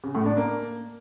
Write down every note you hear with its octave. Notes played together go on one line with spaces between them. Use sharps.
C#3
A2
D4
A#3